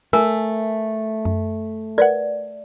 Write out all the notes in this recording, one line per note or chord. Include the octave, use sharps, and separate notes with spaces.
A3 A#4 G#5
F#2
A#4 B4 D5 F#5